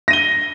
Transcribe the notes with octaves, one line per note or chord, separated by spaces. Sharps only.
A#6 D#7 G7